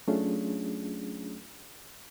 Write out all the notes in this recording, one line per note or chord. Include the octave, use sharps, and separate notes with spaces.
F#3 A3 C#4 D4 F4 G#4